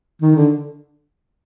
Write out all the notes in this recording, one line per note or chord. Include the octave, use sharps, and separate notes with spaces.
D#3
D3